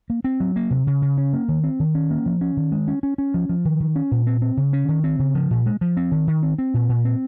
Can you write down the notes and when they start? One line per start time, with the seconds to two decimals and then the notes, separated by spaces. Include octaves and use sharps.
0.10 A#3
0.24 C4
0.40 F#3
0.56 A#3
0.71 C3
0.87 C#3
1.02 C#3
1.18 C#4
1.33 A#3
1.48 D#3
1.64 C4
1.80 D#3
1.95 C#4
2.11 A#3
2.26 F3
2.41 C#4
2.57 D#3
2.72 G#3
2.88 C#4
3.03 C#4
3.18 C#4
3.34 F3
3.49 F3
3.65 D#3
3.80 D#3
3.96 C#4
4.11 A#2
4.27 C4
4.42 C4
4.57 C#3
4.73 C#4
4.89 D#3
5.04 C4
5.19 C#3
5.35 F3
5.51 A#2
5.66 G#3
5.81 F3
5.97 C4
6.12 D#3
6.27 D#3
6.43 C4
6.58 C4
6.74 A#2
6.89 A#2
7.05 C4